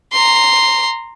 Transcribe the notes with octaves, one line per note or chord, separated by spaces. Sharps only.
A#5 C6